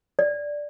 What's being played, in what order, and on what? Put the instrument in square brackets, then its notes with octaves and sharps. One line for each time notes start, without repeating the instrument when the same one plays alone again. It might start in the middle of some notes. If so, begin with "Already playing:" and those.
[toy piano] D5